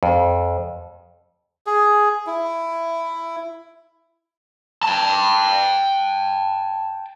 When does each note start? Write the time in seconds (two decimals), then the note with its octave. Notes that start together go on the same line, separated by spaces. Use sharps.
0.03 F2
1.67 G#4
2.27 E4
4.83 G5 A5